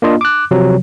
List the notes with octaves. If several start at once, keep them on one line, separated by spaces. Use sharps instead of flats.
A#3 D4 F4 D#5
D6 F#6
C3 F3 F#3